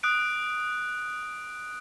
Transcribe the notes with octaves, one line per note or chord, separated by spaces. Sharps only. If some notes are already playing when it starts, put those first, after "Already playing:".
D#6 F#6 D7